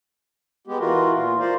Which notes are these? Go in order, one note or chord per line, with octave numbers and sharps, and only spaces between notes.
G#3 B3 G4
E3 F4 F#4 A#4
A#2 F4
A#4 C5 D5 F5